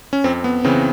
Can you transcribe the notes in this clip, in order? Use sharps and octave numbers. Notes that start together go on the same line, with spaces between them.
C#4
F2 C4
B3
C#3 E3 C4